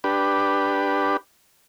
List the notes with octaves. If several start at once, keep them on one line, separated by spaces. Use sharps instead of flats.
D4 G4 B4